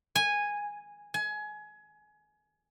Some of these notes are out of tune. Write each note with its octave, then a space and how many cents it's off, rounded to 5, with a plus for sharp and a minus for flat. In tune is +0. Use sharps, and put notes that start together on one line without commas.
G#5 -10
G#5 +25